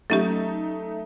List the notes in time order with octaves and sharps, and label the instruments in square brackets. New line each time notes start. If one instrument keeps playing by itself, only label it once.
[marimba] F#3 C#4 G4 [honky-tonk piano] A3 D#4